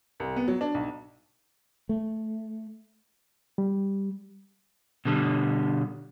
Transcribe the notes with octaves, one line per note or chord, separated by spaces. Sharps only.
C2
B3
F#3
D4
B1
A3
G3
B2 D3 G3